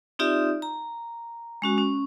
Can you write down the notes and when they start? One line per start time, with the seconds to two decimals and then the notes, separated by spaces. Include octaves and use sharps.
0.19 C4 D#4 F4 G4 D5 E5
0.62 A#5
1.62 G#3 C#4 F#4
1.78 C#4